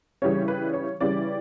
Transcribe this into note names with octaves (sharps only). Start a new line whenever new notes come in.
C#3 E3 G3 C#4 C#5
B4
C#5
C#3 E3 G3 C#4 D5